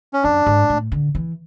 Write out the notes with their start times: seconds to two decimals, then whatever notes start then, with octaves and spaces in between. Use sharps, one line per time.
0.13 C#4
0.23 F#2 D4
0.46 G#2
0.70 A2
0.92 D3
1.15 E3